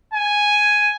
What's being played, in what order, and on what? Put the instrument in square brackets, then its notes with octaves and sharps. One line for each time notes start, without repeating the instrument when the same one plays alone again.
[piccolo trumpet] G#5